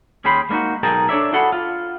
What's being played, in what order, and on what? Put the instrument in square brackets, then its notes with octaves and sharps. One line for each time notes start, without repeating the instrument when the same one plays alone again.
[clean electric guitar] D#2 C#4 G#4 G5 B5 C6
G#3 A#3 D4 D#4 F#4
B1 G#4 A#4 D#5 G5 A5
D4 A4 C#5 D5 E5
E4 F#4 G#4 A4 F#5 B5
F4